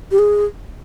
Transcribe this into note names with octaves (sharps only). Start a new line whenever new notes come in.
G4
G#4